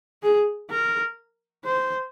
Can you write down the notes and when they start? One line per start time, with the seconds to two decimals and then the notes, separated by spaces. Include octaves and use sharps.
0.23 G#4
0.71 A#4
1.65 C5